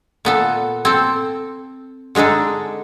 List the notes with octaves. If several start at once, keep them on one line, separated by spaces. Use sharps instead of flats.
A#2 B3 A4
C4 A4
D3 G#3 D4 D#4 A4